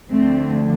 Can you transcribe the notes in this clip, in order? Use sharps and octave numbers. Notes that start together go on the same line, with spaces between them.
D2 D3 F3 A3 C4